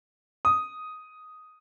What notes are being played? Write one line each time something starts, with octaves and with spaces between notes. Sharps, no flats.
D#6